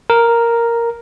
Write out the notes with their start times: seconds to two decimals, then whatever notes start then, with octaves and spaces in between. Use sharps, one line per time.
0.10 A#4